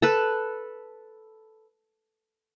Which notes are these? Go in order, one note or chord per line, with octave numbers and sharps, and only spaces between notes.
A4 B4